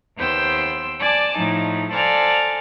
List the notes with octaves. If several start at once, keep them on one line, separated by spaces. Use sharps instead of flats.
D#2 B3 C5 G5 C6 E6
D5 G#5 A5 D6
A2 F3 D#4
A4 C5 D5 F5 G#5 A#5